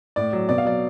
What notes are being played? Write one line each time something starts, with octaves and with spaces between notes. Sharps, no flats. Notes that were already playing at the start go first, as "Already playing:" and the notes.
A2 D5
F#3
B2 D5
F5
F#3 D5